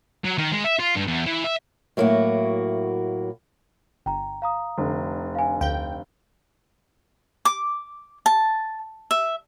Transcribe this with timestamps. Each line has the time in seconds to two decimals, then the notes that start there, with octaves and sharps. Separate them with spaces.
0.24 F#3
0.38 D#3
0.52 G#3
0.64 E5
0.79 F4
0.95 G2
1.07 E2
1.26 E3
1.44 E5
1.97 A2 F#3 A#3 E4 F#4
4.06 G1 G5 A#5
4.42 F5 A#5 D#6
4.78 F1 D3
5.35 F5 G#5
5.61 D2 F5 G5 G7
7.45 D6
8.26 A5
9.11 E5